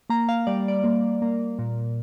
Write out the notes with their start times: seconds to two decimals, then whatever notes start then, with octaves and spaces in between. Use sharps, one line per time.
0.10 A#3 A#5
0.29 F5
0.47 G3 D5
0.68 D5
0.84 A#3
1.22 A#3
1.59 A#2